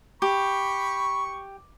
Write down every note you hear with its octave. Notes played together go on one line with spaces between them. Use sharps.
G4 B5 C#6